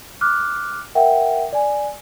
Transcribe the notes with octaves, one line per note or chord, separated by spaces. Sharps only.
D6 F6 F#6
A#4 E5 F#5 G5
D5 G#5